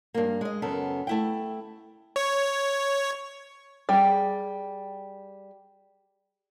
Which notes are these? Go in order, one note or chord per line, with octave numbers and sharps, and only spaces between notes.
G2 A#3
G#3 D#5
F#2 C#3 B3 A4 A#4
A3 E4 G5
C#5
G3 G#4